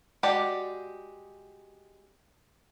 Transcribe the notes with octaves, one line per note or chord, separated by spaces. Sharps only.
G#3 F#4 G4 D5 A5